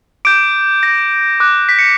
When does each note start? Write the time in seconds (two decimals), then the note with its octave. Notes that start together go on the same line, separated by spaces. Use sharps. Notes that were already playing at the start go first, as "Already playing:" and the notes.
0.25 D6 G6 D7
0.83 A#6
1.40 D6 F#6
1.69 B6
1.79 C#7